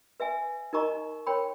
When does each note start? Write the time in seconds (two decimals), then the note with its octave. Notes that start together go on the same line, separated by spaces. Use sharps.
0.20 B4 E5 G#5
0.73 D#4 A#4 D#5 A#5 C#6
1.27 A#4 C#5 G5 B5